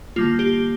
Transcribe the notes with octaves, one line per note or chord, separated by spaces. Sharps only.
D3 G3 A#3 F4
G4